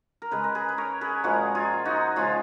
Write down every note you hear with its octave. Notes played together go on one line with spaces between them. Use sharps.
A#4
C#3 G#3 G#4 B4
A#4
G#4 B4
B4
A#4 C#5
G#4 B4
A#2 F3 G#3 F#4 A#4
F4 G#4
D#4 F#4
C#3 F3 G#3 C#4 F4